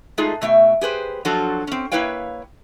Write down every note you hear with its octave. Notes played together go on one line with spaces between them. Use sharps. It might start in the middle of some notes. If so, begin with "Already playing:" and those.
G#3 A3 D#4 F4 G#4
B2 A3 E5 G5
G4 G#4 B4 C5
F3 F#3 D4 F4 F#4 A4
C4 C#4
A#3 E4 B4 C#5 F5 G5